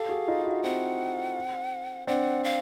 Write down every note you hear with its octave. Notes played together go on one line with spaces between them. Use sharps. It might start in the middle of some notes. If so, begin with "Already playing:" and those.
Already playing: G4 A4 F5
F#4 G#4
D#4 F4
E4 F#4
C4 F#5
C4 D4 F#5
F5